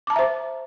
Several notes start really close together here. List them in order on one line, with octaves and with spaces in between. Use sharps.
D6 A5 A#5 E5 C5